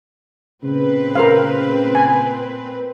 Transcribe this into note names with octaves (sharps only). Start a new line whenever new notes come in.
A#2 C#3 C4 B4
A#4 C5 F5
G#5